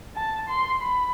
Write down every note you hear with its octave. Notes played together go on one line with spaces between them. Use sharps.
A5
C6
B5